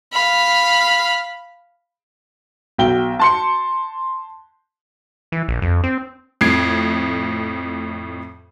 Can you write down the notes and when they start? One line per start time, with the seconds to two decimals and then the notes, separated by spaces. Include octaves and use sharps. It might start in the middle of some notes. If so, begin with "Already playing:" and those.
0.13 F5 B5
2.78 B1 G5 G7
3.19 A5 C6 C#7
5.32 E3
5.48 A#1
5.62 F2
5.84 C4
6.41 F2 A2 G#6 C7 D7